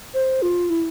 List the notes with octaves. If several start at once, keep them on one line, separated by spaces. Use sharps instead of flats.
C5
F4
E4